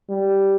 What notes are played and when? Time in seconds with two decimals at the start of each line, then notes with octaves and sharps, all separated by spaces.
0.10 G3